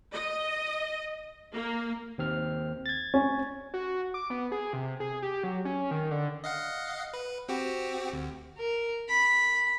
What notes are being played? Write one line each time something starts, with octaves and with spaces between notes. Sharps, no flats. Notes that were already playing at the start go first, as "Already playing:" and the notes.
D#5
A#3
D#2 C4 F6
G#6 A6
C#4
F#4
D6
B3
G#4
C3
G#4
G4
F#3
C#4
D#3
D3
D#5 F5 F#5
B4
C4 F#4 G4
D2
A#4
B5